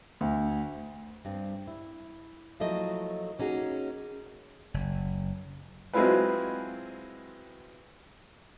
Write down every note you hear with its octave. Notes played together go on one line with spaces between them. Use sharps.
D2
G2 C4
E4
F3 F#3 A3 A#3 E4 D#5
A#3 C#4 D#4 F#4 G#4
F#1
F#3 G#3 C4 E4 F4 B4